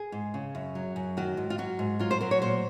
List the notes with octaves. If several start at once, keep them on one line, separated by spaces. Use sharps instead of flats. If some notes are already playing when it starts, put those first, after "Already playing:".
Already playing: G#4
G#2
C#3
F#2
F#3
F#2
D#3 F#4
G#2
F4
F#3 F#4
G#2
F#3 F4
C5
F#3 A#4
C#5
A#2 C5